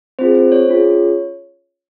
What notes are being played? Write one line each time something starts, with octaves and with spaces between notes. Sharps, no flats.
C4 F4 G#4 C5
C5
C#5
C#4 F4 G#4